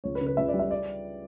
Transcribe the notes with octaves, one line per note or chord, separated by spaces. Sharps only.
C#2 C#5
B4
C#3
B4
C#2 E5
D5
G3
E5
D5